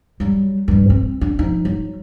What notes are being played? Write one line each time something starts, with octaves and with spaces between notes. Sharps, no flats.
F#3 G3
G2 E3
C4
D4
F3 D#4
F#3